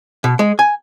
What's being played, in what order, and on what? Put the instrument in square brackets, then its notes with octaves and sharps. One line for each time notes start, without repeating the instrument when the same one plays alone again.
[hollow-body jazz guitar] B2
G#3
G#5